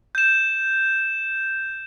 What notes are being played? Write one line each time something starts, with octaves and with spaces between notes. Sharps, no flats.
G6 E7